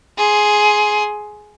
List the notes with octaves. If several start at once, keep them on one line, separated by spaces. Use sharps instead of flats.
G#4 C6